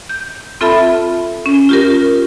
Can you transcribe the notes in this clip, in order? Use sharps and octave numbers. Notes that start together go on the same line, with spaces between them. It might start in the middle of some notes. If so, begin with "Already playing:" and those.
G6
C4 F4 A4 E5 A5 B5
C#4
F4 G4 A#4